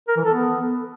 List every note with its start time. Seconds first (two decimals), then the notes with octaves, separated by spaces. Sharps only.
0.08 A#4
0.17 E3
0.25 A4
0.34 B3